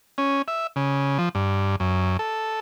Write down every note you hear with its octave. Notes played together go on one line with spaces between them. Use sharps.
C#4
E5
C#3
F3
G2
F#2
A4